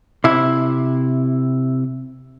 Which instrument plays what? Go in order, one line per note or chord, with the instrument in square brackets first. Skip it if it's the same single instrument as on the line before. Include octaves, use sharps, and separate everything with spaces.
[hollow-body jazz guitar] C3 E4